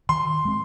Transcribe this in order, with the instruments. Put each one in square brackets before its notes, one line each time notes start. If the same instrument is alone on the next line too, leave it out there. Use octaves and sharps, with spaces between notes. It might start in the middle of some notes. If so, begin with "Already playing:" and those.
[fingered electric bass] D#3 [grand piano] C6
[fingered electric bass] G#3 C4